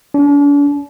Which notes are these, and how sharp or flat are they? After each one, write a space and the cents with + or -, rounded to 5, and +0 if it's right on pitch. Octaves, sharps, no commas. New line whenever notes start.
D4 -45